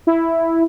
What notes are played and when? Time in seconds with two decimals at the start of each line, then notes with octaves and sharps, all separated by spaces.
0.07 E4